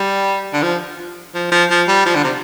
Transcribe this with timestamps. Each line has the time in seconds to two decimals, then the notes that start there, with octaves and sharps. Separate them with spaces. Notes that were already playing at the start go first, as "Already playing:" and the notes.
Already playing: G3
0.53 D3
0.62 F3
1.35 F3
1.52 F3
1.70 F3
1.88 G3
2.06 F3
2.15 D3
2.24 C3